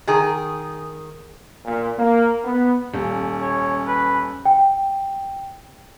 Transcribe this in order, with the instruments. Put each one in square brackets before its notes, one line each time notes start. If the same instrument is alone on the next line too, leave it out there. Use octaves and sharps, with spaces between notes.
[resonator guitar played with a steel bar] D#3 G#4
[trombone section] A#2
A#3
B3
[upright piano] D#1 [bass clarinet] C#4
[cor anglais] C#5
B4
[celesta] G5